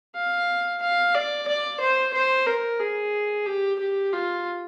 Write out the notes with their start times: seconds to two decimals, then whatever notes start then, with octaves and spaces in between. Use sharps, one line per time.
0.16 F5
0.82 F5
1.15 D5
1.48 D5
1.81 C5
2.13 C5
2.46 A#4
2.80 G#4
3.46 G4
3.79 G4
4.13 F4